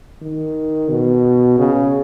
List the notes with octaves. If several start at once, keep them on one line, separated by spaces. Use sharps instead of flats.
D#3
B2
C#3